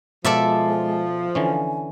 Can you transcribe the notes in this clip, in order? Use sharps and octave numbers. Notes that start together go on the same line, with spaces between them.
B2 F3 G#3 F4 A4 D5 E5
D3 E3 C#4 G#5